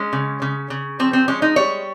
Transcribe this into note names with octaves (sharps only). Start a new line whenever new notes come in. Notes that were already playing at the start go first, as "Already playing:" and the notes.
Already playing: G#3 C#4
C#3
C#3
C#3
F3 C4
C4
G#3 C#4
D#4
G3 C#5